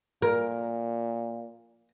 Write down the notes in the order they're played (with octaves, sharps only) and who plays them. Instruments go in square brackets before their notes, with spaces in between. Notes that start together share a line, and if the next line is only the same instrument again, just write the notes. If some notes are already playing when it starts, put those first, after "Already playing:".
[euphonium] A#2 [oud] A#4